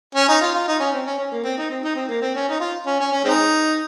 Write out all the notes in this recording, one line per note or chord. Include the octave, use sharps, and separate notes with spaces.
C#4
D#4
F4
F4
D#4
C#4
C4
C#4
C#4
A#3
C4
D#4
C4
D#4
C4
A#3
C4
C#4
D#4
F4
C#4
C#4
C#4
G#3 C4 D#4